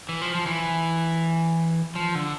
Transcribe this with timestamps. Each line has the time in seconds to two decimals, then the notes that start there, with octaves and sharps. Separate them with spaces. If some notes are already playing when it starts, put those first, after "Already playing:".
0.09 E3
0.21 F3
0.34 F3
0.46 E3
1.95 F3
2.15 D3